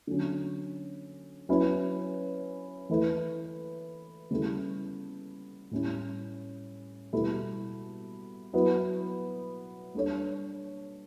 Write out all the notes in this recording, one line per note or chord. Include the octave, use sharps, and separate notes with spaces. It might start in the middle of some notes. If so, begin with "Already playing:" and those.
D3 F#3 C#4
F#3 C#4 E4 B4
E3 A3 E4 B4
C#3 G3 B3 E4 A4
A2 G3 C#4 E4
B2 G3 B3 E4 A4
F#3 B3 E4 B4
G3 D4 A4 C#5